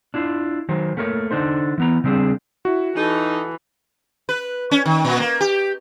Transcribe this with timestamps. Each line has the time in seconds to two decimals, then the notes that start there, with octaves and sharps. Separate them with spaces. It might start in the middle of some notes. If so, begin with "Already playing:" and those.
0.14 D4 E4 F4
0.69 D#3 F#3 C5
0.97 A3 A#3 A#4 B4 C#5
1.31 D3 D4 D#4 C5
1.78 E3 B3 A#5
2.04 C#3 G3 C4 D4 G#4
2.65 E4 F#4
2.97 E3 D#4 A4
4.29 B4
4.71 C#4
4.85 D#3
5.05 A#2
5.20 A#3
5.41 G4